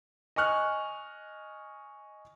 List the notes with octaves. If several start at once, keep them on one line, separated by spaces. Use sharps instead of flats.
D#5 G#5 C#6 F6 F#6